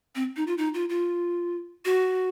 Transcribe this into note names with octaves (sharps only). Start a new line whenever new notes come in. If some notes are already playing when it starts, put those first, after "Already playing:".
C4
D#4
F4
D#4
F4
F4
F#4